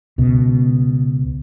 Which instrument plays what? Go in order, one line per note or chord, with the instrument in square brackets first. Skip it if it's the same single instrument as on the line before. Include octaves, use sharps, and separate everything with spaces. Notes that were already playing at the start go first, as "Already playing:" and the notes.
[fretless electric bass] C#2 B2